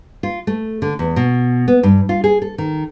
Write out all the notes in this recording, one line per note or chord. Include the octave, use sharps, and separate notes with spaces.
F4
A3
D3
E2
B2
B3
G2
F4
G#4
A4
D#3